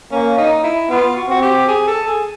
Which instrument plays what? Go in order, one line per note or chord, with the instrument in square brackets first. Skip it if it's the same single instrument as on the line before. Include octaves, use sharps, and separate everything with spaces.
[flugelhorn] A#3 [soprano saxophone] C#4
[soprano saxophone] D#4
E4
[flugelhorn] B3 [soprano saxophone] F4
[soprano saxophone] F#4
[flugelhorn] C4 [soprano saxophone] F#4
[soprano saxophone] G4
G#4
A4
G#4